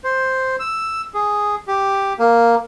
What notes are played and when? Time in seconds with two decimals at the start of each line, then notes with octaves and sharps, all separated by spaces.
0.04 C5
0.59 E6
1.14 G#4
1.68 G4
2.19 A#3